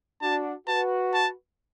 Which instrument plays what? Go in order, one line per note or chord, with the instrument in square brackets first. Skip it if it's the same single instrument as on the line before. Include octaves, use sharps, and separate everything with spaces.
[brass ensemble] D4 F#4 [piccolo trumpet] A5
[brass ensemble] F#4 B4 [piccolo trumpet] A5
[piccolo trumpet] A5